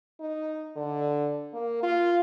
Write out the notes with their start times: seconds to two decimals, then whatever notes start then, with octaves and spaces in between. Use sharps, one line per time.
0.20 D#4
0.76 D3
1.54 A#3
1.83 F4